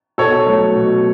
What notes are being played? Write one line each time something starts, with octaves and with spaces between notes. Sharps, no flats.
B2 A4 C#5
F#3 A3
B2